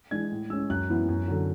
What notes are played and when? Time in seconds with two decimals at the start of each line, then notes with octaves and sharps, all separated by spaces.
0.11 E3 G#3 D4 G#6
0.31 A2
0.50 G#3 C#4 E6
0.70 F#2 F#6
0.90 E3 B3 E4
1.09 F#2
1.28 D3 F#3